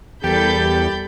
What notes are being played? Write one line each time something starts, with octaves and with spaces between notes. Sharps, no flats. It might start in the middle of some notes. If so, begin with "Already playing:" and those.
E2 G3 G4 A4 A#4 B5 G6 A6